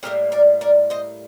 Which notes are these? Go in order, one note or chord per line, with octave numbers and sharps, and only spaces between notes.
A2 G3 A#3 G4 A#4
A#4 D5
A#4 D5
C5 D#5